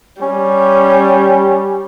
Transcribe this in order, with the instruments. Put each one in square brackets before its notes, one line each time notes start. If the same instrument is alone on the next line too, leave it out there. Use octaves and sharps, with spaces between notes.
[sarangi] G3 [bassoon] C#4